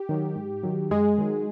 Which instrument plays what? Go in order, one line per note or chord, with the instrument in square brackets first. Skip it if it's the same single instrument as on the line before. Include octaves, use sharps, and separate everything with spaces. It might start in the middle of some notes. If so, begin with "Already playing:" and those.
Already playing: [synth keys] G4
D#3 F#3
G#2
D#3 F#3
F#2 G#3 G#4
D#3 F#3